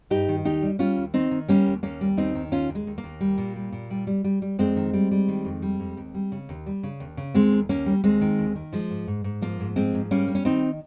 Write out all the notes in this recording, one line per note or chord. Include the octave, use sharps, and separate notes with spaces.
G2 D#4 G4
D#3
D#2 D#4 G4
G3
G3 C#4 F4
D#2
D#3 C4 D#4
D#3
G3 A#3 C#4
D#2
D#2 A#3 C#4
G3
D#2 C4 D#4
D#3
D#2 C#4 F4
D#2
G#3
D#2
A#3
D#2
G3
A#2
G3
A#2
G3
G3
G3
G3
F2 G#3 C4
D#3
G3
G3
D#3
F2
G3
F2
D#2
G3
C#3
D#2
G3
C#3
D#2
C#3
D#2 G#3 C4
D#2
D#2 A#3 C#4
G3
D#2 G#3 C4
D#3
D#2
D#3
F3 G#3
G#2
G#2
G#2
F3 A#3
G#2
F3 G#3 C4
G#2
G3 A#3 C#4
G3
C#4
D#3 C4 D#4